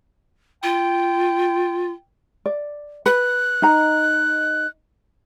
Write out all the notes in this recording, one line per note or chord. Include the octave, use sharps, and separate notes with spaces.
F4 G5
D5
B4 F#6
D#4 D#5 A#5